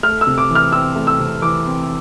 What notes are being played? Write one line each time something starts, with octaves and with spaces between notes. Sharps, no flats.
A3 F6
E6
C3
D6
E3
F6
C4 E6
A3
E6
C3
E3 D6
C4